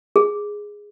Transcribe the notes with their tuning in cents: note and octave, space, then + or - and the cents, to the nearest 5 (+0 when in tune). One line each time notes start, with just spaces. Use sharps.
G#4 -5